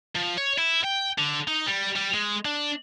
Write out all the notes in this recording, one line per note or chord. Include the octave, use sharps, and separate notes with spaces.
F3
C#5
E4
G5
D3
D#4
G3
G3
G#3
D4